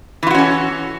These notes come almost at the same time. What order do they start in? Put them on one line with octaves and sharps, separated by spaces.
E3 F4 F#4 C#4 A4